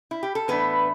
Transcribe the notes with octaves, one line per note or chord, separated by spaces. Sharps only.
E4
G4
A4
A2 E3 A3 B3 D4 B4